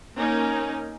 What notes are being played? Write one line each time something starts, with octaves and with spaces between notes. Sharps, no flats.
A#3 C#4 D#4 A#4